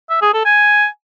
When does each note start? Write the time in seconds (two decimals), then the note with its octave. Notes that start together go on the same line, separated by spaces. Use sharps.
0.10 E5
0.22 G#4
0.34 A4
0.45 G#5